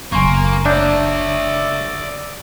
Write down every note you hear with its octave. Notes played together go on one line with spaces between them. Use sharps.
F#1 F#2 A#3 G#5 C6 C#6
D4 C#5 D5 E5 G6